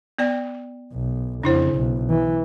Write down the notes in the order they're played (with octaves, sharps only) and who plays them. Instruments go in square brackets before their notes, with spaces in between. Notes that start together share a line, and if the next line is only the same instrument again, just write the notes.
[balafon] B3 D5 G5
[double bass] B1
[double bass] F2 C#3 [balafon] D4 E4 C5
[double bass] B1
E3